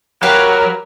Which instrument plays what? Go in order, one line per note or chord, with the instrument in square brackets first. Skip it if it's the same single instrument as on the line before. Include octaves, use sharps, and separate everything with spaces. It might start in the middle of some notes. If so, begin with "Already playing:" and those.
[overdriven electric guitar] F#3 [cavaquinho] G4 B4 F5 [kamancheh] A#4